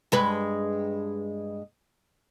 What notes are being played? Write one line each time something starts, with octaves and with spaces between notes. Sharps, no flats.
G2 G#3 B4